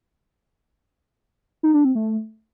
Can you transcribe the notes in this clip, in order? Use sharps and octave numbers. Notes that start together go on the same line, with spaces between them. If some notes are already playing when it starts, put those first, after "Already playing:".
D#4
D4
C4
A3